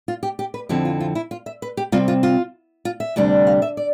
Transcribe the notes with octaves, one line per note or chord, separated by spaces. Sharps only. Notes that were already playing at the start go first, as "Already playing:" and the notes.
F4
G4
G4
B4
F2 D3 F3 C4 E4 G4
F4
F4
E4
F4
E5
B4
G4
C3 G3 C4 F4
F4
F4
F4
E5
D2 C3 G3 D4
F5
E5
D5